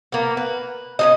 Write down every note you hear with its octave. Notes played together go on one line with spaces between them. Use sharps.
A#3 B3
B4
C#4 D#4 D#5